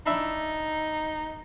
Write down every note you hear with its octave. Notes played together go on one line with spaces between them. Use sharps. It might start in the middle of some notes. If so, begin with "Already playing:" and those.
D4 D#4 E5 B5